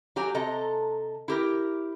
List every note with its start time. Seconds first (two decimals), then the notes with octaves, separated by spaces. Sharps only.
0.16 F#3 G4 G#5 A#5
0.34 C3 A4 D#5 A#5
1.28 E4 G4 A#4